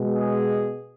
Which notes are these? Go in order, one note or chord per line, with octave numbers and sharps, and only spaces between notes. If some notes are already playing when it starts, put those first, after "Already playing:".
Already playing: B2 G#3
G#4